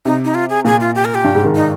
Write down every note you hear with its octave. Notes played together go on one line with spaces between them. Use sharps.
C3 D#4
D#4
F4
G#4
A#2 G#4
F4
G4
A#4
G4
G2
G#2
D#3
D#4